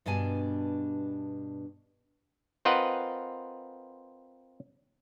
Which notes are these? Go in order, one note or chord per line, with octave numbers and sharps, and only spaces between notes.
G2 B2 D4 G#5 A5
C4 F4 A#4 B4 D#5 F#5